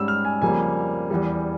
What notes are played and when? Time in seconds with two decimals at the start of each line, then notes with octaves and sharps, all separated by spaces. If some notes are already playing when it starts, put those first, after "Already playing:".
Already playing: G#2 G3 C#4 E6
0.08 F6
0.25 G#5
0.42 F2 C#3 G3 A#3 G#5
1.10 E2 E3 G3